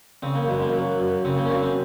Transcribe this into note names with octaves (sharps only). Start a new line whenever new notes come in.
C#3 C4
A#3
F#2 G#3
A#3
F#3
F#2
C#3 C4
A#3
C#4
F#2 C4
C4